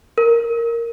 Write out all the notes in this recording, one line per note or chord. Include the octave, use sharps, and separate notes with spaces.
A#4